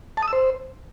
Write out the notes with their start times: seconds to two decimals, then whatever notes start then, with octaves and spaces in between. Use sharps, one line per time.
0.17 A5
0.22 D#6
0.28 E6
0.33 C5